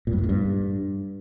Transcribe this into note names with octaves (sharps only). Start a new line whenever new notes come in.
A#2
G2
G#2
A2
G2